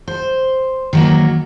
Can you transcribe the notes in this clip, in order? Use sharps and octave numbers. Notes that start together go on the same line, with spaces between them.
C5
D#3 F#3 A#3